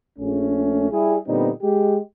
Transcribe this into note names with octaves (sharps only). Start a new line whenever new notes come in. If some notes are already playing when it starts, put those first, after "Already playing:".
A#1 A3 C#4
G3 E4 G#4
A#2 D3 G3 B3 C4 D#4
G#3 G4